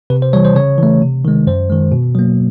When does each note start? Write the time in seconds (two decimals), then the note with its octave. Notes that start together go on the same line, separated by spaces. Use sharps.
0.10 C3 B4
0.22 C5
0.33 E3 G3 C#5
0.45 C5
0.55 C#3 C#5
0.78 E3 A3
1.02 C3
1.25 D#3 G#3
1.47 F#2 C5
1.70 D#3 G#3
1.92 B2
2.15 F#3 A#3